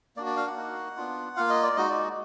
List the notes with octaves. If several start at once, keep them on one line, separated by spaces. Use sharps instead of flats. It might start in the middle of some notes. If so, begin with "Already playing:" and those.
A#3 D4 F#4 D5
D5
F5
F#5
A#3 D#4 F#4
B3 D4 F4
A#3 F4 F5
D#5
D5
G#3 D#4 F#4 D#5
D5